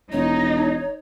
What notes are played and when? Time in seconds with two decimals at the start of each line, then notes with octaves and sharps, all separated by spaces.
0.12 E1 D#4 C#5